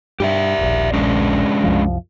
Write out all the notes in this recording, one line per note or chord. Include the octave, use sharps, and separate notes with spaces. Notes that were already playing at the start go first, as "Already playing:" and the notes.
G2 G4 D5 E5
D#1 A#1
G#3 C#4 D4
C2 F#2 F3